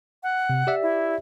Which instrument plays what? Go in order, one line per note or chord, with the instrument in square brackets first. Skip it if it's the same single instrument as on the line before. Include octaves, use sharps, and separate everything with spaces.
[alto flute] F#5
[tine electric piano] C3
G4 D5 E5
[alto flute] E4